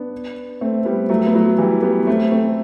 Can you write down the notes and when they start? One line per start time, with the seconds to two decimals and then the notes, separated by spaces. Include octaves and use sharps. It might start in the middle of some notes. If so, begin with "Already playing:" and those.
Already playing: B3 D4
0.61 A3 C4
0.85 G3 B3
1.09 F#3 A3
1.26 B3
1.34 F#3 A3
1.58 E3 G3
1.82 G3 B3
2.07 A3 C4
2.32 A3 C4